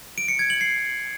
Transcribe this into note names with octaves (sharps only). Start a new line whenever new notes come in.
D7
C#7
G#6
F#7
C7